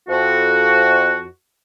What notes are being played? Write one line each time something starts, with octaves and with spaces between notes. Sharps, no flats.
F2 F#4